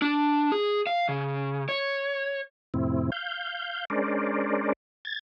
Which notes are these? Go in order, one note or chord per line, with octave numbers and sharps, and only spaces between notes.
D4
G#4
F5
C#3
C#5
F2 A2 C3 C4 E4
F5 G6
G#3 C#4 D4 A#4 C5 D5
G#6 A6